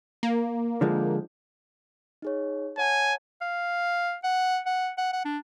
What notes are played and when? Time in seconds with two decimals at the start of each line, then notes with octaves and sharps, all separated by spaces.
0.23 A#3
0.81 D3 F3 G#3
2.22 D#4 G#4 C#5
2.78 C#5 F#5 G#5 A5
3.41 F5
4.24 F#5
4.66 F#5
4.98 F#5
5.13 F#5
5.25 D4